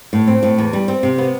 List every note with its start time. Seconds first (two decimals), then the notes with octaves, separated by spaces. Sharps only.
0.13 A2
0.27 C4
0.43 A2
0.58 E2
0.73 G3
0.88 C4
1.03 C3
1.18 B3